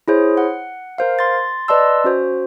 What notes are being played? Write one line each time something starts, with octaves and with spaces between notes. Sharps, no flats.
E4 G#4 C5 C#5
F#5
A#4 C5 F5
C6 A6
B4 D5 D#5 A5 C6 E6
C#4 F#4 C5